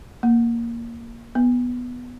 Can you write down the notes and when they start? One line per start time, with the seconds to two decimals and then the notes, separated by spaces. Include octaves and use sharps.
0.23 A#3
1.35 B3